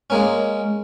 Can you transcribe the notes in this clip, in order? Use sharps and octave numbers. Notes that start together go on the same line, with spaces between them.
G#3 A#3 C#4